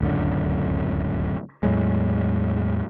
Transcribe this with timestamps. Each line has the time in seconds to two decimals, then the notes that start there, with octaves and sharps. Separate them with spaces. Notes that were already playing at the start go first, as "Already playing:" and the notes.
0.01 D1 C#2 F#2 D3
1.63 E2 A2 F#3 G#3